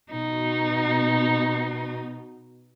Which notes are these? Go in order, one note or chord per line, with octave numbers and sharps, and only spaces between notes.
B2 D#4